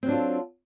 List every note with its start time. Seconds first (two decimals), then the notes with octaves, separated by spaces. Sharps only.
0.03 C4
0.06 F#3
0.09 D4
0.11 F4
0.14 A4